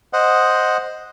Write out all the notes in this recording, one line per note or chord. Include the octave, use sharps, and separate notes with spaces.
C5 D#5 F#5